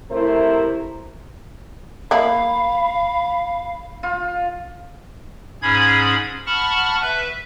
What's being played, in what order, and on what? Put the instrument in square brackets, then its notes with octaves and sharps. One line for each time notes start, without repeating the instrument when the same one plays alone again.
[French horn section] C3 A3 E4 A#4 C5
[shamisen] A#3 E4 [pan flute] F5 [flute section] B5
[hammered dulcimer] F4
[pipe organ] G#2 C#4 G#4 B5 G#6
F#5 A5 B5 C#6 F6
B4 E5